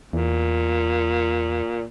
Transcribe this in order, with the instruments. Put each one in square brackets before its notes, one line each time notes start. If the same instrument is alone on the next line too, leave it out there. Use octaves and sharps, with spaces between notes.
[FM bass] E2 [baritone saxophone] A#2